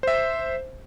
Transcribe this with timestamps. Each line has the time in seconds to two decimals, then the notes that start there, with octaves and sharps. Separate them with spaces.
0.03 C5 E5